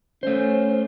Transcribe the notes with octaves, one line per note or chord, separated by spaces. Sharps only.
A3 C#4 C5